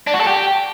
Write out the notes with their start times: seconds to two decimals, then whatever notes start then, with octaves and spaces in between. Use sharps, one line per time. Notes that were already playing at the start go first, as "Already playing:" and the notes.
0.07 D4
0.14 F#4
0.20 A4
0.27 G4